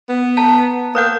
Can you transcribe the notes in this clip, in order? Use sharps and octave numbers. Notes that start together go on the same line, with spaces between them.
B3
A5 A#5
A#3 B4 F#5 D#6 F#6 G6